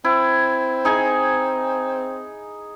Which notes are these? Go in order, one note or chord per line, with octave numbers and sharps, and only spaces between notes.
C4 E4
D#4 G#4 G#5